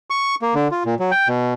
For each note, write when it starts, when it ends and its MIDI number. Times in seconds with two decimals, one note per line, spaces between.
0.10 0.35 85
0.42 0.54 58
0.55 0.68 50
0.71 0.83 65
0.86 0.95 46
1.00 1.11 54
1.11 1.28 79
1.28 1.54 47